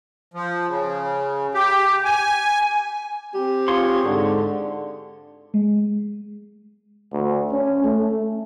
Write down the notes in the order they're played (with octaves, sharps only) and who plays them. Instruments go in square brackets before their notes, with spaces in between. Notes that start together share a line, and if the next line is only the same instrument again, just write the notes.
[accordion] F3
C#3
G4
G#5
[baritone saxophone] C4 [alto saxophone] G4
[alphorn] F4 [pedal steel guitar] G#4 C#5 C6
[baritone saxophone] G#2 [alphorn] D3
[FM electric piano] G#3
[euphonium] D2
C#4
A3